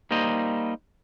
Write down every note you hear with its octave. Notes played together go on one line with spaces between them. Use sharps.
G3 A#3 D#4 C5 D#5